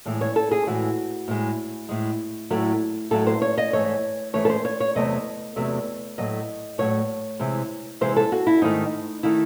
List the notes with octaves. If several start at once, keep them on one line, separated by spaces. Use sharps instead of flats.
A2 E3 G#3
C#5
A4
G#4
A2 E3 G#3 F#4
A2 G#3
A2 G#3
A2 F#3 A3
A2 F#3 A3 A4
C5
C#5
D#5
G#2 E3 A3 C#5
G#2 E3 A3 C#5
A4
C5
C#5
C#5
E2 C3 F#3 A3 D#5
E2 C3 F#3 A3
A2 F#3 A3 D#5
A2 F#3 A3 C#5
C3 E3 G#3
C3 E3 G#3 C5
A4
F#4
E4
G#2 D#3 A3 D#4
D#3 A3 E4